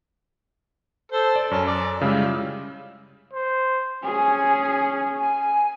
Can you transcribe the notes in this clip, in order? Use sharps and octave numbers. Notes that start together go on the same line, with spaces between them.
A4 C5
D5
F#2 C#4 A4
D5
C#3 G3 G#3 E4 F4
C5
C#4 G#4 G#5
G#5